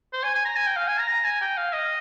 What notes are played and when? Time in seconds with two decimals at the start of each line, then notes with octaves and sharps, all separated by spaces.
0.13 C5
0.24 G#5
0.35 G#5
0.45 A#5
0.56 G#5
0.66 G5
0.76 F5
0.88 G#5
0.98 A#5
1.09 A#5
1.25 G#5
1.41 G5
1.57 F5
1.73 D#5